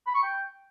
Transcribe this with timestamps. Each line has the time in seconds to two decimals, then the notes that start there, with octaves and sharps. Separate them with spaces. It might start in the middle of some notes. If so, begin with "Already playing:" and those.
0.07 B5
0.15 C#6
0.23 G5